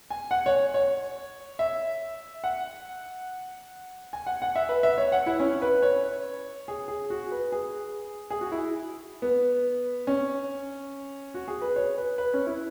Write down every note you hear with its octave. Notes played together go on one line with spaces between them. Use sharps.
G#5
F#5
C#5
C#5
E5
F#5
G#5
F#5
F#5
E5
B4
E5
C#5
F#5
E4
C#4
B4
C#5
G#4
G#4
F#4
B4
G#4
G#4
F#4
E4
B3
C#4
F#4
G#4
B4
C#5
B4
B4
C#4
E4